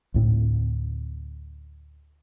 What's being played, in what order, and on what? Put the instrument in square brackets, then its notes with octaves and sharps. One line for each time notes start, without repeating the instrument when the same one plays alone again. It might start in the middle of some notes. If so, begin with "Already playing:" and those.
[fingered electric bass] D2 A2 C4